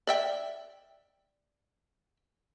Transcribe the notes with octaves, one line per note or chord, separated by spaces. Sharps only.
D5 E5 G5